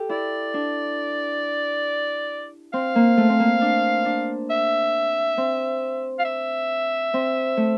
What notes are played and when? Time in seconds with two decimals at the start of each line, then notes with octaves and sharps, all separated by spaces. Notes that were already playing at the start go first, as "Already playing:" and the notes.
Already playing: G4 A4
0.09 E4 D5
0.54 D4
2.73 C4 F5
2.95 A#3
3.17 A3
3.29 C4
3.40 A#3
3.61 D4
4.05 D4
4.50 E5
5.37 C4
6.19 F5
6.25 E5
7.14 C4
7.57 A3